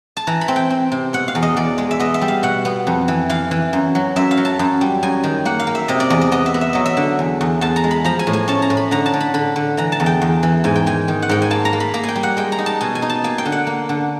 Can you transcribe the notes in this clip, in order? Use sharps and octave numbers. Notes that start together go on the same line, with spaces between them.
A5
E3 A#5
B5
C4
G5
C4
C3
B2 F#5
F5
E2
D#5
E2 D5
G#3
E5
B3 D#5
E5
G3
F5
B2 F#5
B3
F2
E3
E3 F5
E3
F#2
F#3
F#2 E5
F5
F#3
A5
F#2
G3
F#2 G#5
D#3
A#3 F#5
F5
A#3
E5
C3 D#5
D5
E2 D#5
D#5
B3 D#5
E5
B3
E5
F#3 D#5
E5
D3
E2
E2
E2 A5
A#5
G#3
B5
F3 A#5
G#5
A2
G#5
C#4 A5
A#5
A2
B5
D3 A#5
A5
D3
B5
D3 B5
D3
E3 A#5
A5
E2
G5
E2
E3
G#2 G#5
G5
D#3 G#5
D#3
F#5
G#2 G5
G#5
A#3 A5
A#5
A#3
B5
A#3 A#5
G#5
G5
G3
F#5
G#3 G5
A#5
D#4
A5
B2 G#5
G#5
D#4
A5
A#3 G#5
G5
D3
F#5
A#3
D3